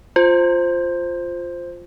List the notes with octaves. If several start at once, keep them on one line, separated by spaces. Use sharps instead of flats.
F4 C5